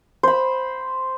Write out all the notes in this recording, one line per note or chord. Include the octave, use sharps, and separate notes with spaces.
C5 B5